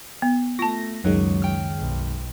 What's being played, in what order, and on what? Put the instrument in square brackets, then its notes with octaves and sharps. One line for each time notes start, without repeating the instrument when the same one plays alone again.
[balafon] B3
[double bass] A3 [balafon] F4 A5 [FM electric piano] A#6
[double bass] C#2 [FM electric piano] F#2 D#3 G#3 [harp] F#3
[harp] G5 F6
[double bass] B1